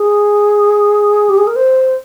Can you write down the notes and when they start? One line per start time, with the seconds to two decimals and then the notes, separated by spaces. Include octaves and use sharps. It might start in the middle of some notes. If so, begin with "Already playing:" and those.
Already playing: G#4
1.29 G4
1.38 G#4
1.47 A#4
1.56 C5